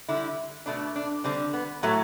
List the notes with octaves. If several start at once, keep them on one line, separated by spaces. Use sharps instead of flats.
D3 G3 E4
B2 A3 D4
D4
D3 G3 C4
B3
A2 F#3 A3 B3